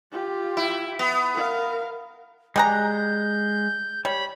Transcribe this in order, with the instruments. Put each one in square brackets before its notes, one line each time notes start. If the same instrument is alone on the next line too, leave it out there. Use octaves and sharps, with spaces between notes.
[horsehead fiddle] F4 G4
[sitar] E4
B3
[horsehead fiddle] A#4 F5
[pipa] G3 G#4 A#5 [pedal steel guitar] G#3 F#6 [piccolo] G6
[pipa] G3 [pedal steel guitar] C#5 [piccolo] B5